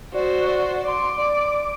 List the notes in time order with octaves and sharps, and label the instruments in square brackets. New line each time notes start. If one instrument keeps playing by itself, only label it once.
[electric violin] F#4 C5 [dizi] D5
[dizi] D5
[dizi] C6 [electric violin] D6
[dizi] D5